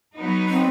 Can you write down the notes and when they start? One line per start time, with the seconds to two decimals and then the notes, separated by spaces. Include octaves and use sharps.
0.17 F#3 B3 D#4
0.49 C4